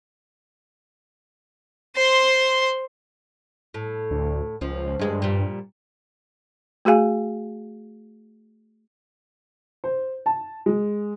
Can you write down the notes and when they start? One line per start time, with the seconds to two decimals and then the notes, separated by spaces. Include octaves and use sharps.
1.96 C5 C6
3.74 A2
4.11 D2
4.61 C#2 F3
4.99 D2 G2 G#3
5.22 A#2 G3
6.85 A3 F#4 G#4 F5 G#5
9.84 C5
10.26 A5
10.66 G#3